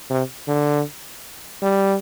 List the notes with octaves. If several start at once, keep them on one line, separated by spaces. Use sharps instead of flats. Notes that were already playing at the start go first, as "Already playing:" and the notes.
C3
D3
G3